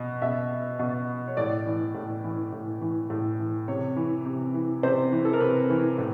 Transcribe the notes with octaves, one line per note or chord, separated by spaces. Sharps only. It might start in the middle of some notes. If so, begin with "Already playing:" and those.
Already playing: B2
B2 E5
B2
C#5
A2 D5
E3
A2
E3
A2
E3
A2
E3
C3 C#5
E3
C3
E3
C3 C5
E3
A4
A#4
C3 B4
E3
A2